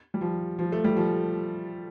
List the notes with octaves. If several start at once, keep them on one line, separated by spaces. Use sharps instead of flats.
G3
F3
F3
A3
G3
F3